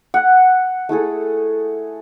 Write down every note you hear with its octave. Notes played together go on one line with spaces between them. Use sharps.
F#5
A3 E4 G#4 A4